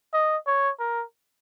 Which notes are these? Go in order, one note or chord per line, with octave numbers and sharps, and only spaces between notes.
D#5
C#5
A#4